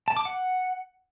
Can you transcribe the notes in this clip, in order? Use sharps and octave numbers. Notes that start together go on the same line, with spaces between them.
A5
D6
F#5